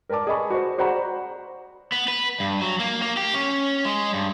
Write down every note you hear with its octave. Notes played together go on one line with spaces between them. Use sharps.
A#4 B4 D5 A5 D6
G#4 A#4 D#5 A5 B5 C#6
F#4 C5
F#4 C5 D5 F#5 A#5 B5
B3
B4
G2
F#3
A#3
A#3
G4
C#4
G#3
G2